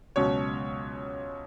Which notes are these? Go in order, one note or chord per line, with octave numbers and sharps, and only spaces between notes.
C#2 B2 F#3 C#4 C#5